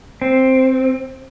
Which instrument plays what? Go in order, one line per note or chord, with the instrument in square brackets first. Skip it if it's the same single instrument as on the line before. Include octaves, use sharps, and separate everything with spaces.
[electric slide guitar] C4